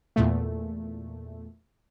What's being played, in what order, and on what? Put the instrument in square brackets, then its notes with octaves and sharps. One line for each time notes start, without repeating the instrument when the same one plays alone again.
[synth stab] E2 A#2 A3